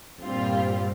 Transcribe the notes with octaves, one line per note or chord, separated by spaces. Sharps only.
F2
G2 A#2 G3 C4 F4